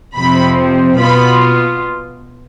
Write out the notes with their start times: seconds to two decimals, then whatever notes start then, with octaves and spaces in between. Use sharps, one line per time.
0.17 F2 C3 F3 C4 B5
0.99 B2 B3 F4 B5